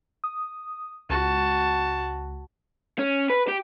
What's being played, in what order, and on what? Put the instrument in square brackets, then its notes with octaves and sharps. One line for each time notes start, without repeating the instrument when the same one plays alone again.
[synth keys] D#6
[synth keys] C#2 [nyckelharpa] F#4 A5
[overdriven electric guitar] C#4
B4
G4